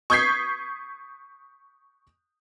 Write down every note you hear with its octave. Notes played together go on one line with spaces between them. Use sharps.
C#6 D#6 G6 G#6 B6 C7